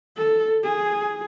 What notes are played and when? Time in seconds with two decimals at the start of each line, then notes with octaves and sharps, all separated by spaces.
0.17 A4
0.64 G#4